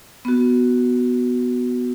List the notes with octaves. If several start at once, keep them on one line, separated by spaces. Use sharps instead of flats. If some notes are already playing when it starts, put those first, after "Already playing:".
B3 F#4